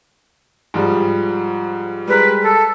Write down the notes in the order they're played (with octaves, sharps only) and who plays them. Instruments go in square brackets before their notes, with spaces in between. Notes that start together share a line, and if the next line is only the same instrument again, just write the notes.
[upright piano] G#2 F3 G3
[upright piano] G3 G#3 A#4 [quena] B4
[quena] A4